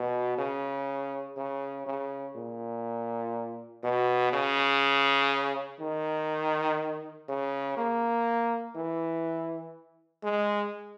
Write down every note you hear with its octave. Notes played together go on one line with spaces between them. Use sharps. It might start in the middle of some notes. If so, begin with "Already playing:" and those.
Already playing: B2
C#3
C#3
C#3
A#2
B2
C#3
D#3
C#3
A#3
E3
G#3